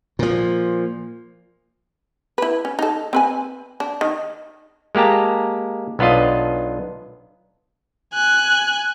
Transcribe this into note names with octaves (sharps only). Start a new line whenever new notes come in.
A#2 F3
E4 B4
C#4
D#4 A4
C4 B4 G#5
D4
D#3
G#3 A#3 G4 A5 A#5
B1 B3 D4 F4 D#5
G#5 F#6